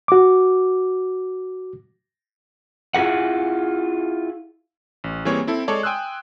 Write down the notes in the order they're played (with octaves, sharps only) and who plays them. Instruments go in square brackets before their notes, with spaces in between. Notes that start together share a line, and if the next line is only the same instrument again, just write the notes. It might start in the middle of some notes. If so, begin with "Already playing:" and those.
[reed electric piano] F#4 D6
[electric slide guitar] E4 F4 G#4 A#4 F#5
[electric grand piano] A1
E3 G3 A#3 C4 G#4 C#5
C4 E4 A4
G#3 A4 C#5 D5
G5 G#5 C6 D#6 E6 F#6